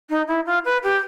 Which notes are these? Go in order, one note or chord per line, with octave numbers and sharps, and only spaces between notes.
D#4
E4
F4
B4
G4